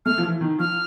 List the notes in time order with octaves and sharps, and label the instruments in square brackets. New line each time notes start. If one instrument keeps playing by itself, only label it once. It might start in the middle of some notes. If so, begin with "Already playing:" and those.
[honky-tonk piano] A3 [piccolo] F6
[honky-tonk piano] F3
E3
D#3
[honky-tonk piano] F3 [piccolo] F6